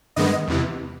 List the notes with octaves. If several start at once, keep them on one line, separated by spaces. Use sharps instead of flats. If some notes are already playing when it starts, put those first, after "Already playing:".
G2 D#3 G#3 B3 D#5
E2 C3 E3